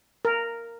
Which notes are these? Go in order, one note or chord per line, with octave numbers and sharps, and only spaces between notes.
A#4